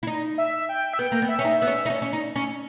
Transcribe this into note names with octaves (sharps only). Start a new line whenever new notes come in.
E4
D#4
E5
G5
E5
B3 G5
A#3
B3
E5
C#4
D#4
B3 E5
C#4
D#4
C#4
C#4
D#4
C#4